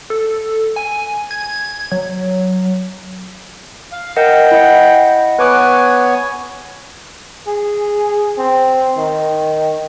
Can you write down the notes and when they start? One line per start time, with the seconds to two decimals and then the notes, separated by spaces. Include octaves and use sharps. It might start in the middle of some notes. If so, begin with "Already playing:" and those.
0.10 A4
0.76 G#5
1.31 G#6
1.92 F#3
3.92 F5
4.16 A#4 D#5 F#5 G5
4.52 E4 D#5 F#5
5.39 B3 B4 C#5 G#5 D6 F#6
7.47 G#4
8.38 C4
8.98 D#3